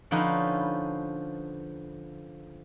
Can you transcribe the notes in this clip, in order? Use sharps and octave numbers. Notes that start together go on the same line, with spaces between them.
D3 F3 C#4 D#4 B4